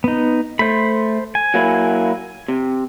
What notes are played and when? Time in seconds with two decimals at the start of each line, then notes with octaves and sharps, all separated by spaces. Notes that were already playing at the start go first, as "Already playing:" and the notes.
0.04 B3 D#4
0.59 A3 C5 B5
1.35 G#5
1.54 F#3 A#3 E4
2.48 C3